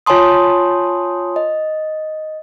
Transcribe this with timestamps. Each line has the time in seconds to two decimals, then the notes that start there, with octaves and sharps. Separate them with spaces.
0.06 F4 C#5 G#5 A5 C6 D#6
1.36 D#5